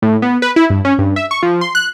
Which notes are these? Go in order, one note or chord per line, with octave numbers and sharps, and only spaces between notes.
A2
B3
B4
E4
G2
C#4
G2
E5
C#6
F3
C6
F#6